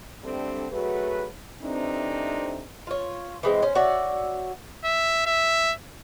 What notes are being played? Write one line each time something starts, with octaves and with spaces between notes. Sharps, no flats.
D3 G3 A3 C4 D4 A4
F#3 A3 F#4 G#4 B4
C3 E3 A3 C4 D4 D#4
F4 C#5
E3 G#3 C4
C#4 C5
F#4 C#5 D5 E5
E5
E5